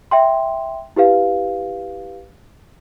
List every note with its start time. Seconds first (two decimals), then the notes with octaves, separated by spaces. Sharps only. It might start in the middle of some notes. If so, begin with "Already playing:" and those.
0.11 E5 G5 C6
0.96 E4 G4 B4 F5